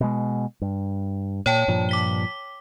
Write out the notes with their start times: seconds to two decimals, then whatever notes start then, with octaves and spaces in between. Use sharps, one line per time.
0.01 B2 G#3
0.61 G2
1.46 A#2 C#5 G5 A5
1.68 G2 A#2 F3
1.89 D6 B6 G7